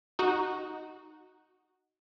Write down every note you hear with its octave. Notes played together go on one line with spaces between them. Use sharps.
D#4 F#4